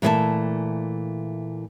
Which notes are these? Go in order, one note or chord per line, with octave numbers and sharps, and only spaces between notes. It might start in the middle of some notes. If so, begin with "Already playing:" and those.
A#2 E3 A3 D5 E5 A5